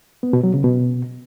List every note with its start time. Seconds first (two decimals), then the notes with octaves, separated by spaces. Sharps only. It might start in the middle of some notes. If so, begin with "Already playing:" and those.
0.23 B3
0.33 B2
0.43 F#3
0.54 C#3
0.64 B2